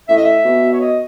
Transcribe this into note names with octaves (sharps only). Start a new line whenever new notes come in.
A2 E5
D#5
E5
B2
C#5
D#5